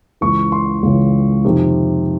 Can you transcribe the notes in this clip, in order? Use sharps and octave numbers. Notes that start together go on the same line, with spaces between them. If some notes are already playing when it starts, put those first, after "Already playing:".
C#2 C#3 E3 C#6
C6
C#2 C#3 E3
F2 C3 D#3